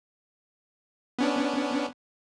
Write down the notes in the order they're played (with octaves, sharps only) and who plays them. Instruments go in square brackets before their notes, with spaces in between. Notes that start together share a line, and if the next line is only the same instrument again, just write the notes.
[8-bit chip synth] B3 C#4 D4